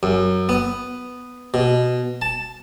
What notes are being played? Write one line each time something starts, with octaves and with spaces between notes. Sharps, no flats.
F#2
B3
B2
A5